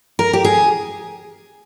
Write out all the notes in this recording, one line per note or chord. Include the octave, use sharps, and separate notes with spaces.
A#4
G4
G#4